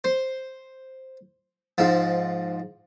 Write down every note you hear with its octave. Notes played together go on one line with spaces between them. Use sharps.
C5
G#2 F3